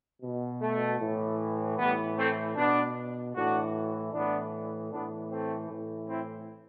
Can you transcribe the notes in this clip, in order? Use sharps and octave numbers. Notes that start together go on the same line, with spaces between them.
B2
A3
A2 E3
A2 E3 G3 B3
A3 C4
B2 B3 D4
A2 E3 D4 F#4
A2 E3 B3 D4
A2 E3 B3 D4
A3 C4
A2 E3
C4 E4